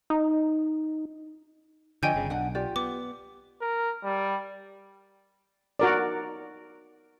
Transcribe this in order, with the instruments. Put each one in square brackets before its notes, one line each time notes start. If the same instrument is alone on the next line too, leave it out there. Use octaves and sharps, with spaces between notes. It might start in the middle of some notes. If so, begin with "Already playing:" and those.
[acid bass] D#4
[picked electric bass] D3 F3 [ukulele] C#5 D#5 [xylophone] G5 G#5 G6
[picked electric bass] G1 C#3
[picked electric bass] B1 [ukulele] D4 F#5
[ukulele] F4 G4 D5
[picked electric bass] B3 [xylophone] D6
[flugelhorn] A#4
G3
[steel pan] F#4 A#4 D5